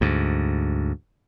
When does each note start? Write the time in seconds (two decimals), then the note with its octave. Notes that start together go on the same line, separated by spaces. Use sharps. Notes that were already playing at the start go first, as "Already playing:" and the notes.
0.01 D2 G#2